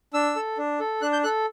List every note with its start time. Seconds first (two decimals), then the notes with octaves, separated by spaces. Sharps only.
0.14 D4 E6
0.36 A4
0.58 D4
0.80 A4
1.02 D4 F#6
1.13 G6
1.24 A4 F#6